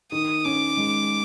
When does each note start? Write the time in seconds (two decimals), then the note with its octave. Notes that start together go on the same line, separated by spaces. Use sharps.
0.12 D#3 D#6
0.44 C#4 D6
0.77 G#3